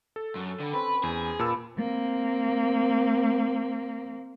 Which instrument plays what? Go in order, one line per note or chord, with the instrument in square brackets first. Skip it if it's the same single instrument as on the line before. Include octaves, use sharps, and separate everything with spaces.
[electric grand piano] A4
[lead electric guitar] F#2
[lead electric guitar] D3 [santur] D5 G5 B5
[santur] C4 C#4 B5 [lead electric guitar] B4
[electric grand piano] E2 [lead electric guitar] G#4
[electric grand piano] A#2 A5 E6 [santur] B4 D5
[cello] A#3 C4